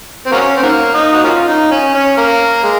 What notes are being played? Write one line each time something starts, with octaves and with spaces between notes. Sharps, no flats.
C4
F#3 A#3 C#4
C4
D#3 F#3 A#3
D#4
F#4
A#3 C#4 F4
D#4
C#4
C#4
A#3
G#3